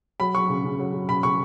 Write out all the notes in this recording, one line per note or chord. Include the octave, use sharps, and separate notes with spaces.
F#3 B5
F#3 C#6
C#3
C#3
F#3
F#3
C#3 B5
C#3 C#6